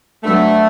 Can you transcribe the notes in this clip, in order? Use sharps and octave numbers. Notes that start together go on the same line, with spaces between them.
F#3 A3 B3 D4